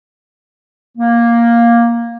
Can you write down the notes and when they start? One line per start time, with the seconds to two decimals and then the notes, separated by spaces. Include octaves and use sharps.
0.98 A#3